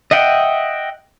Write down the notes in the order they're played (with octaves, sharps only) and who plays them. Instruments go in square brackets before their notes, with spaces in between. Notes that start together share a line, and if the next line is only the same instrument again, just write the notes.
[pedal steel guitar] D#5 E5 F#5 G5